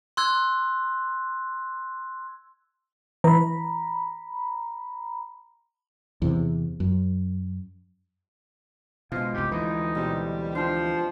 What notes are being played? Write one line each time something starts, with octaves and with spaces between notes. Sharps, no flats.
C6 E6 F#6 G#6
E3 A#5 B5
E2 C3
F#2
B2 F3 G#3 F5
C2 G2 G4
D2 E3 D#4 B4
B2 G3 C4
F3 D4 G4 C5